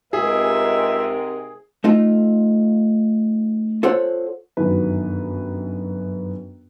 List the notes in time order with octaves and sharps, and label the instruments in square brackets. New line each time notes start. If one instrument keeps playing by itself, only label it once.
[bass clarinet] C#2 [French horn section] G#2 C3 A#4 [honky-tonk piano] G#4 [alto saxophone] E5
[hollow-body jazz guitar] A3 D#4 F4
F4 A4 C5 C#5 F#5
[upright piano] G1 F#2 D#3 B4